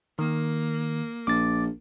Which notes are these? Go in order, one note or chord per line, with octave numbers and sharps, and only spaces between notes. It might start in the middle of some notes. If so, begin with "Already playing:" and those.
D#3 A#3
A#1 D6 A6